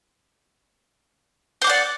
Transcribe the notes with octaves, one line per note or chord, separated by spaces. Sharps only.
C5 D5 F#5 D6